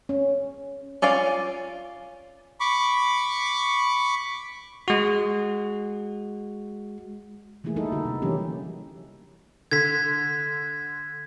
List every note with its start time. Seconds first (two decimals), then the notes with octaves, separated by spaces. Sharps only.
0.09 C#4
1.02 C#4 F4 D5 F5
2.60 B5 C#6 D6
4.88 G#3 F#4
7.64 E3 A3 A#3 E4 G#4
7.76 G3 D#4 E4 A4
7.92 D3 F#4
8.05 C3
8.22 E3 F#3 G3 A#3 C#4 G4
9.71 D3 G#6 B6